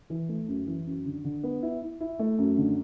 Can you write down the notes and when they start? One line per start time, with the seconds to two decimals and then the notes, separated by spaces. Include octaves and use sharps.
0.10 E3
0.29 A3
0.48 F#2
0.67 E3
0.86 F#2
1.06 D3
1.25 D3
1.43 B3
1.62 E4
1.82 E4
2.01 E4
2.19 A3
2.38 F#2
2.58 D3